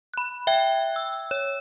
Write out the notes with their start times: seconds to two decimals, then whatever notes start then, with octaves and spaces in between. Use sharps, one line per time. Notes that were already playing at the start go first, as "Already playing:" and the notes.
0.14 B5 F#6
0.47 E5 G5 F#6 G#6
0.96 E6
1.31 C#5